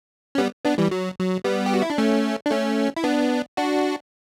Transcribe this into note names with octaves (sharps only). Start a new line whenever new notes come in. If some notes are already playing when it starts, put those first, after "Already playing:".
C#4
G3 B3
B3 D4
E3 G3
F#3
F#3
G3 B3
G4
F#4
E4
D4
A3 C#4
D4
A3 C#4
E4
B3 D4
D4 F#4